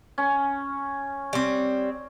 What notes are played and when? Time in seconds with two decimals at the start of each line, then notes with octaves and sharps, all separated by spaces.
0.18 C#4
1.33 G3 C4